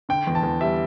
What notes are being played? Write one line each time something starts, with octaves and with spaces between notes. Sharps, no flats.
D3 G5
E2
A5
E2
G3 E5